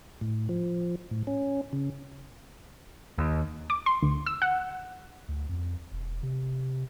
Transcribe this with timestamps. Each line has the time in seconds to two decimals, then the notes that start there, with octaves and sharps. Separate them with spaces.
0.21 A2
0.49 F3
1.11 A2
1.27 C#4
1.73 C#3
3.18 D#2
3.70 D6
3.86 C6
4.02 D2
4.26 E6
4.42 F#5
5.29 D2
5.49 F2
5.92 E1
6.23 C3